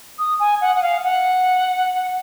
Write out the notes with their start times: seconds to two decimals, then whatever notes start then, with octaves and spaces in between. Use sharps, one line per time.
0.19 D#6
0.39 G#5
0.61 F#5
0.75 F#5
0.82 F5
1.04 F#5